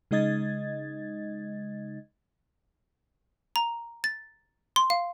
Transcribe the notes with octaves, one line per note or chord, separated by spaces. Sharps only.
C#3 G#3 D#4 D#5 G#6 A6
A#5
A6
C6
F5